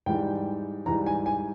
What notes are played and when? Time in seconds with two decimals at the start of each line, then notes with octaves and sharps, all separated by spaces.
0.06 G#2 E3 G3 G5
0.86 G#2 E3 G3 A#5
1.06 G#5
1.26 G#5